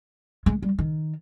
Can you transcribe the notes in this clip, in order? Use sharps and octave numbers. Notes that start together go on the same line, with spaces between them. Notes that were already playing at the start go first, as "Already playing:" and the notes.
G#3
G3
D#3